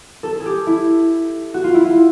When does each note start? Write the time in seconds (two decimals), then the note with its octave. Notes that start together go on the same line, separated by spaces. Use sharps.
0.23 A4
0.35 A4
0.40 G#4
0.46 G4
0.67 E4
1.54 F#4
1.64 F4
1.75 E4
1.85 F4